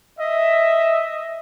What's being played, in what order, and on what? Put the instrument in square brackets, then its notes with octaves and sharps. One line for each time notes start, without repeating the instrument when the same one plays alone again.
[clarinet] D#5 [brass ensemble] E5